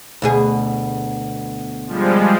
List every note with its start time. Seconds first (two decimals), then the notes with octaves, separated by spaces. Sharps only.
0.22 D2 B2 G#4
1.87 F3 G3 G#3